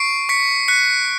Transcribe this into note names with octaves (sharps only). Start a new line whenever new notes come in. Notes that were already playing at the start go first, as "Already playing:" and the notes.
Already playing: C#6 C7 D7
C#6 B6 C#7
F#6 B6 C#7